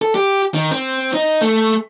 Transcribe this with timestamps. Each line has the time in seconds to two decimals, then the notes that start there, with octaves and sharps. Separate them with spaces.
0.02 A4
0.15 G4
0.54 D#3
0.71 C4
1.14 D#4
1.41 A3